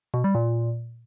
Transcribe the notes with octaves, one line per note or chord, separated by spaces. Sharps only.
B2
G3
A#2